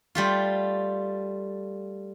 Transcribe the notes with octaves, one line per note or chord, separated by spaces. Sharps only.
G3 A3 F4